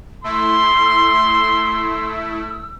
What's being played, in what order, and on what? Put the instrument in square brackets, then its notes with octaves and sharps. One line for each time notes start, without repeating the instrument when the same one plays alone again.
[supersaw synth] A3 E4 [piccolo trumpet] C6 [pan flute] E6